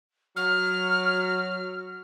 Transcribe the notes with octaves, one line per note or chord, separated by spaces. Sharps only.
F#3 F6